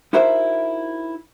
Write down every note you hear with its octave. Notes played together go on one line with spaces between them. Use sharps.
D#4 E4 F#4 A#4 C5 E5